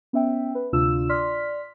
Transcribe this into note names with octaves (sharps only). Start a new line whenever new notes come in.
B3 C#4 E5 G5
B4
D2 C3 D4 F4 E6 E7
D5 C6 F6 B6